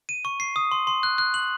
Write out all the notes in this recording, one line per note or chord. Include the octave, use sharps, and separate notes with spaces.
D#7
C#6
C7
D#6
C6
C6
F#6
F#6
F#7